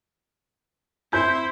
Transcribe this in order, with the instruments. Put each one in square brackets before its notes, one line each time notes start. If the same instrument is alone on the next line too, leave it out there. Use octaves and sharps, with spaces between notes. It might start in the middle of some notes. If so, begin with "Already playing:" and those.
[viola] E4 C5 [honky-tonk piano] G6